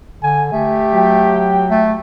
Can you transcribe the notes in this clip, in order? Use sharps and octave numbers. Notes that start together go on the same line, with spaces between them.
D3 G#5
A3 G4
F#3 G5
A3